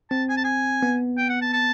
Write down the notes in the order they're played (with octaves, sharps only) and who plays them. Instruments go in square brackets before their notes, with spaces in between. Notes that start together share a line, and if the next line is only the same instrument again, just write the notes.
[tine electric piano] C4 [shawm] A5
[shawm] G#5
A5
G#5
[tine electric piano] B3
[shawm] G5
F#5
A5
A5